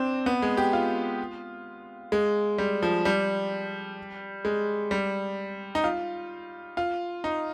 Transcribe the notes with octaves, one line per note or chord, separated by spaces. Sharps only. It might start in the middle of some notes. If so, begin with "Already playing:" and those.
Already playing: C4 D4
B3
G#3
G4
F4
G#3
G3
F3
G3
G#3
G3
D#4
F4
F4
D#4